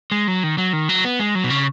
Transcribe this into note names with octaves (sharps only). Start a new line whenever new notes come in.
G#3
F#3
D#3
F#3
D#3
F#3
B3
G#3
F#3
B2
C#3